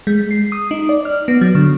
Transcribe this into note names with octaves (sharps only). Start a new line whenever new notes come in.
G#3
C7
D#6
D#4
D5
F6
B3
F#3
D3